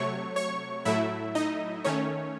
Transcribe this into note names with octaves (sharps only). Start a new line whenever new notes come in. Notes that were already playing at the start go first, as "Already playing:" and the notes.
Already playing: C3 F#3 A3 C#5 C#6
C#5 C#6
A2 F#3 A3 E4 E5
D#4 D#5
D#3 A3 C#4 C#5